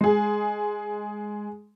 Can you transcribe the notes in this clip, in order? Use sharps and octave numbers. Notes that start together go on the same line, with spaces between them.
G#3 G#4